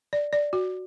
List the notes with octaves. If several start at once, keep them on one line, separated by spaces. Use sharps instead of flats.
D5
D5
F#4